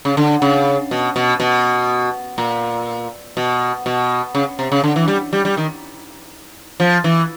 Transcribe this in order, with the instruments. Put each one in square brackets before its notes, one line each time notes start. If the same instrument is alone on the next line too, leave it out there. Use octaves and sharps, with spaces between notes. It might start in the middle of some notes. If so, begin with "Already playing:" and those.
[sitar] C#3
D3
C#3
B2
B2
B2
A#2
B2
B2
C#3
C3
C#3
D3
E3
G3
G3
G3
D#3
F3
E3